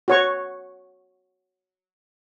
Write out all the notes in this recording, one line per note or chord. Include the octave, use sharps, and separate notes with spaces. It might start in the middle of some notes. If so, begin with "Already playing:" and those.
F#4 C#5 C#6